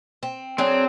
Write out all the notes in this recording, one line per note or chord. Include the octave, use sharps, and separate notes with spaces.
C4
F#3 C4 D4 G#4